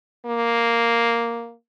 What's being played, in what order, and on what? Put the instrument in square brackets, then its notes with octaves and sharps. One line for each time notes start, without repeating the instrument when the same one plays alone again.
[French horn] A#3